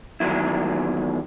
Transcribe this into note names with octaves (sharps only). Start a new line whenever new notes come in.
E2 D#3 F#3 E4